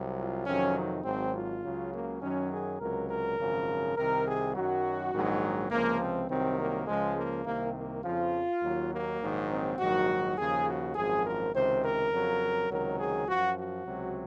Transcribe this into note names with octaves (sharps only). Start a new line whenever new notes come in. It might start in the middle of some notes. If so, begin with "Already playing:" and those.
Already playing: C2 C3 F#3
F4
F2 C3 D#3 F#3 C#4
D#4
G#1 G#2 F#3 C4
F4
C#2 C#3 F#3
A#3
F#2 D#3 F#3 C#4
G#4
C#2 C3 F#3 A#4
A#4
G#1 F#2 C#3 F3
C2 C3 D#3 A#4
G#4
F#2 D#3 F#3 F#4
A#1 G#2 D#3 F#3
C#2 C3 F3 A#3
C4
C2 C3 D#3 F#3 C4
A#3
C#2 C#3 F3 G#3
A#3
C2 C3 D#3 A#3
A#3
F2 C#3 F3 F4
D#2 D#3 F#3
A#3
A#1 G#2 D#3 F#3
C4
A#1 G#2 D#3 F#3 F#4
D#2 C#3 F3 G#4
F#4
G#1 F#2 F3 G#4
A#4
C#2 C3 D#3 C5
A#4
F2 C#3 F#3
C#2 C3 D#3 F#3 A#4
G#4
F#2 F3 F#4
F#4
C#2 C3 F#3